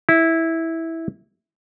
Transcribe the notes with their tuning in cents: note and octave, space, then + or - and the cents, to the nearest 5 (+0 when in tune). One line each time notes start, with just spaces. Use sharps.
E4 -10